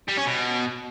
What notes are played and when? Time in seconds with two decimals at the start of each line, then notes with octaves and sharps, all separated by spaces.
0.08 G3
0.17 C#4
0.27 B2